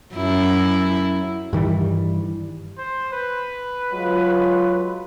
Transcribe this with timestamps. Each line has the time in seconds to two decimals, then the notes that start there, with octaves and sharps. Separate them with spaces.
0.15 F#2 E4
1.53 G2 D#3 E3 G3
2.78 C5
3.13 B4
3.92 F#3 G#3 F4